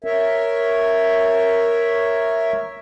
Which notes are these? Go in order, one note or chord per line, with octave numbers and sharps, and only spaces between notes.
A#4 C#5 E5